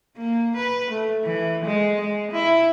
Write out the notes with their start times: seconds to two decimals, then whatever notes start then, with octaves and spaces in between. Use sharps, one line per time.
0.18 A#3
0.57 B4
0.91 A3
1.24 E3
1.65 G#3
2.01 G#3
2.32 E4